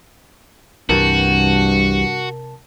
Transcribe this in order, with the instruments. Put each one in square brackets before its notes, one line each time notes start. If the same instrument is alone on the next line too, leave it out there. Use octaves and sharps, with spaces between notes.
[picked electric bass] C2 E3 G3 [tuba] G2 [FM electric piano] C3 A#4 A5 [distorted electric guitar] F#4